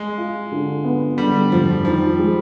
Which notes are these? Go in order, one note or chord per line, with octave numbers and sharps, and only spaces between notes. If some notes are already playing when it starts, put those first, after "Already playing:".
Already playing: G#3
F4
D3
B3
D3 G3
F2 F3
D#3 F3
G#3